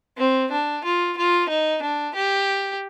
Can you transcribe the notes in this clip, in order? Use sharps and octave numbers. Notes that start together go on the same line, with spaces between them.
C4
D4
F4
F4
D#4
D4
G4